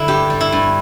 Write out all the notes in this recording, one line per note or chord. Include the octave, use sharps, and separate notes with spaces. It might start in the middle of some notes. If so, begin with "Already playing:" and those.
Already playing: D3 E4
G2 G4
G3
E4
G2